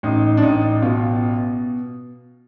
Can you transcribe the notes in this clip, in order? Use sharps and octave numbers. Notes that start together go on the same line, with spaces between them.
A1 D#4
D4
A1 D#4
B2 F4